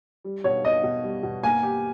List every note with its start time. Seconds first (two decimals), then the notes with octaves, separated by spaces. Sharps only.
0.25 G3
0.44 B2 C#5
0.64 B3 D#5
0.84 B2
1.04 G3
1.23 B2
1.43 A#3 G#5
1.63 G4